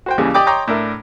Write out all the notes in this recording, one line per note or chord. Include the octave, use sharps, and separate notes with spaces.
F#4 C5 G5
D#2 C#3 E3 G3
G4 D5 D#5 G5 D6 D#6
C#5 D#5 G5 A#5 C6 D6
A2 D4 A#4 E5